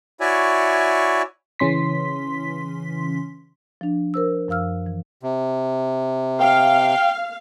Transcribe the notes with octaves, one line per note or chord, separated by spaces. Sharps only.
E4 F#4 C#5 D5 E5 G#5
C#3 E3 C#4 C6 B6
F3 D4
A#4 C5 E6
F#2 F3 F5 E6 F6
E3
C3
F5 G5